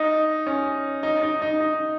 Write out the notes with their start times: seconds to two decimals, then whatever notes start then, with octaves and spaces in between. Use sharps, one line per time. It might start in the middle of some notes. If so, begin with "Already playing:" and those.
Already playing: D#4
0.47 C#4
1.03 D#4
1.23 D#4
1.42 D#4
1.60 D#4